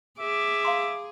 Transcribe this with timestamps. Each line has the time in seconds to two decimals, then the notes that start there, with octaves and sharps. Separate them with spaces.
0.20 G#4 E5 D6
0.65 F5 A#5 C6